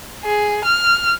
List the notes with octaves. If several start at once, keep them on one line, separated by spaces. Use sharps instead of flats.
G#4
F6